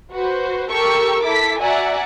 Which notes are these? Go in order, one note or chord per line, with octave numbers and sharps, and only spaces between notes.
F#4 B4 C5
G4 A4 A#4 C#6 E6
E4 A4 D6 B6
F#4 D5 E5 F#5 G#5 A#5